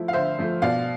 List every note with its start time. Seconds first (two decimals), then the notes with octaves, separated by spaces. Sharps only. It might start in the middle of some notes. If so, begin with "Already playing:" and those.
Already playing: F3 A3 E4
0.08 F5
0.13 D3 C5 E5
0.39 F3 A3
0.62 B2 D5 F5